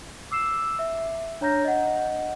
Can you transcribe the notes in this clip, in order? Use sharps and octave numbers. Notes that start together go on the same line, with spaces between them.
D6 E6 C7 E7
E5
D4 C#5 A#5 F6 G6 A#6
D#5 F#5